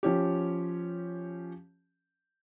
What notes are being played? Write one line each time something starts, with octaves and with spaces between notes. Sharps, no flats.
F3 C#4 G4